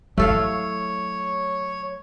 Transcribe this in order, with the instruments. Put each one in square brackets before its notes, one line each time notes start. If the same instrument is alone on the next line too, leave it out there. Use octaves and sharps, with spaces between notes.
[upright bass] F#3 E4 [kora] A3 A4 F5 [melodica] C#5